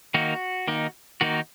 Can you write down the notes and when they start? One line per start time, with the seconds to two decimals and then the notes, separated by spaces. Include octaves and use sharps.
0.14 D#3 A#3 D#4 F#4
0.68 D#3 A#3 D#4
1.21 D#3 A#3 D#4 F#4